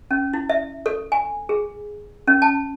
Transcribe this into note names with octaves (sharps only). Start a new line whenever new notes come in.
C#4
E4
E5
A4
G#5
G#4
C#4
A5